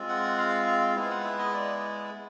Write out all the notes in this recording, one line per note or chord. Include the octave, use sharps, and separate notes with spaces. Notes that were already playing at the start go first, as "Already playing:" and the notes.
Already playing: G#3 C4 F4
F#5
F5
F5
G#3 B3 E4 F5
F#5
E5
D#5
D5